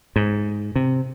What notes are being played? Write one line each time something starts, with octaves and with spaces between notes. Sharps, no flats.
G#2
C3